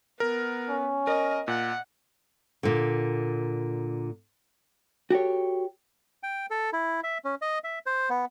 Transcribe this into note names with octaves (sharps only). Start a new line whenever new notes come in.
B3 A#4
C#4
A#4 D#5
A#2 F#5
A#2 D3
F#4 G4 A4 C#5
G5
A4
E4
E5
C#4
D#5
E5
C5
B3